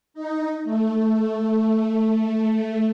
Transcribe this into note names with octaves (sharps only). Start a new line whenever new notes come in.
D#4
A3